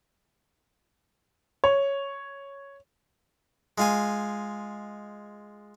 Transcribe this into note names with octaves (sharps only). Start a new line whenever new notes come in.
C#5
G#3 F4 G#5